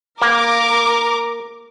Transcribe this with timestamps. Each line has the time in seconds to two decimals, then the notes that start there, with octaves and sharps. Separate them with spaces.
0.22 A#3 A#4 D6